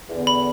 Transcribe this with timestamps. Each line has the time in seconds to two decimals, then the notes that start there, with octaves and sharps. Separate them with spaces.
0.10 E2 D3 B3
0.27 B5